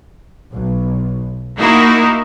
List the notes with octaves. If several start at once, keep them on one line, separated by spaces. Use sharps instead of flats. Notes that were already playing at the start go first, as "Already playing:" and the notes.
B1
A#3 D#4 E4 F#4